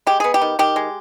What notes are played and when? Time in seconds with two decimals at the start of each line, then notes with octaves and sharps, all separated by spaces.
0.07 G#3 G4
0.20 B3 G#4
0.34 G4
0.41 D#3
0.59 D#3 G4
0.76 G#3